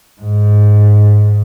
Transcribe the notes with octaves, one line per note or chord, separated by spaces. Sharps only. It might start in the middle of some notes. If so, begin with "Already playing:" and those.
G#2